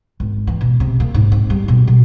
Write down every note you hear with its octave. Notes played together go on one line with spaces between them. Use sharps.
G#1
E3
B2
C3
A#3
G#2
C4
G3
B2
B2